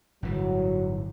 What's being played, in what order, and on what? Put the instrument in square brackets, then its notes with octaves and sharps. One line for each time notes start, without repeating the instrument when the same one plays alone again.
[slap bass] G1 A2 E3 [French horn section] F#3